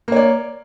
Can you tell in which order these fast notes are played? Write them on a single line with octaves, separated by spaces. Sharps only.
A#3 C#5 D5